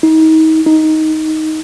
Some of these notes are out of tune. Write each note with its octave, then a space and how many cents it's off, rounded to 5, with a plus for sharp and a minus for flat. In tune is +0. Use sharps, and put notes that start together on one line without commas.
D#4 +35
D#4 +10